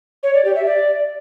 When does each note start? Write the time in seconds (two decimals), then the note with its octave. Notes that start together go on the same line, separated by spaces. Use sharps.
0.23 C#5
0.34 D5
0.45 G4
0.55 E5
0.66 D5